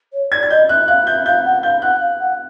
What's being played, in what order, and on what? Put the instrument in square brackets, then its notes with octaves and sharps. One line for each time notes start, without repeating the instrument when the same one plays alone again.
[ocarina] C#5
[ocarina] D5 [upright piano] G#6
[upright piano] G#6
[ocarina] D#5 [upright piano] G6
[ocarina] E5 [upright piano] F#6
[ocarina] F5 [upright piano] F#6
[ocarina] E5 [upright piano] G6
[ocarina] F5 [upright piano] G6
[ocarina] F#5
[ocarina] F5 [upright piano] G6
[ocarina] F#5 [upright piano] F#6
[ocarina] F5
F#5